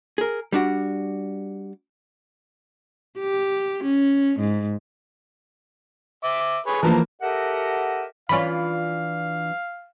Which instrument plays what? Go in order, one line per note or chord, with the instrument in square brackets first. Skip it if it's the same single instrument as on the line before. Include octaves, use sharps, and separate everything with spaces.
[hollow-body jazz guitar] G#4 A#4
G3 D4 F#4
[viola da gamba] G4
C#4
G#2
[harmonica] E5 D6
G#4 B4 C#5
[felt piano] E3 F3 A#3 [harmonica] A#4 A5
[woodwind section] G4 A4 A#4 D#5 E5 F#5
[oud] E3 D4 F4 [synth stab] C#4 B5 [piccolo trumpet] F5